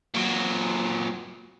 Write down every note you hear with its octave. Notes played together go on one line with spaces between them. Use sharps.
A#2 F#3